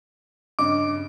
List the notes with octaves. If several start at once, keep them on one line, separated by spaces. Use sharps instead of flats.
G2 C#3 D#5 D6